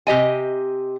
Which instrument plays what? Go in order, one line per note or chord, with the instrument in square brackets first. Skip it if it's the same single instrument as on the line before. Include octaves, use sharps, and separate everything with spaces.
[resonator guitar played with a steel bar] C3 G4 D#5 G#5